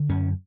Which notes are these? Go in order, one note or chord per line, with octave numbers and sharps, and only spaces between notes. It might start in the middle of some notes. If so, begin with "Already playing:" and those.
Already playing: D3
F#2 C#4